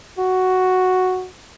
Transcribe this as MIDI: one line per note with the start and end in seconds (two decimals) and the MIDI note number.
0.19 1.28 66